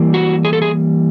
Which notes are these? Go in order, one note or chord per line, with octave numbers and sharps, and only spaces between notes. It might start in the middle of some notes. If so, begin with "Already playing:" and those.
Already playing: E3 G3 A#3
F#4
G#4
A4
G#4